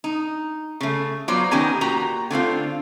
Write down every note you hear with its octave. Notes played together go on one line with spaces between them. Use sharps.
D#4
C#3 A3
F#3 B3 F4 C5 D5
D#3 B3 C#4 G4 G#5 A#5
A#2 F#4 G4 A#5
D3 A3 C4 F4